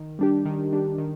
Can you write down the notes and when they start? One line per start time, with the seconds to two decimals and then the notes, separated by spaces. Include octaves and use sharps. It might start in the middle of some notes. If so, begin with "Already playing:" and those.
Already playing: D#3
0.19 G3 D4 G4
0.45 D#3
0.72 G3 D4 G4
0.98 D#3